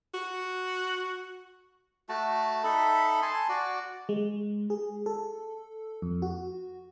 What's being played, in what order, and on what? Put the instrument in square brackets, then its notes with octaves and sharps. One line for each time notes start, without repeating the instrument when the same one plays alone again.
[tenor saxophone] F#4
[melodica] A3 F#4 A5
D#4 A4 E5 B5
G#5 A5 C6
F#4 D5
[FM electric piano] G#3
G#4
A4
F2
F#4